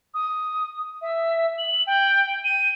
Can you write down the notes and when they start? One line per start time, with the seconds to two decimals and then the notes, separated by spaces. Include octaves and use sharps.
0.14 D#6
1.01 E5
1.58 F#7
1.87 G5
2.44 D#7